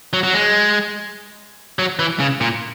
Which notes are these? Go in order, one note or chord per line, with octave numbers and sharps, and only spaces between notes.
F#3
F#3
G#3
F#3
E3
C#3
A#2